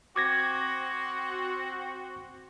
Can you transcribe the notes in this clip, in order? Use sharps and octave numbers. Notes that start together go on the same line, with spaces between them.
C4 F#4 D6 G#6 A#6